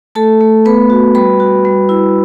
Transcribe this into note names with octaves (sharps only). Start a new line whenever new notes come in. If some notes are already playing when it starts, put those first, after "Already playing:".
A3 A4 A5
A3
B3 B4 B5
F#4
G3 B4 B5
F#4
G3
E4